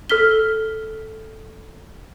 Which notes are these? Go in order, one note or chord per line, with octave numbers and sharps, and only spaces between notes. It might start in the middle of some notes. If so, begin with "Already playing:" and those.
A4 F6 B6 G7